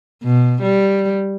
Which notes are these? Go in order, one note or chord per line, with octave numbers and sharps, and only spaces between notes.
B2
G3